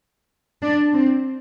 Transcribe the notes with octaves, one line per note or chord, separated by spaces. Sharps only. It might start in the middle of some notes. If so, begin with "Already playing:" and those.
D4
C4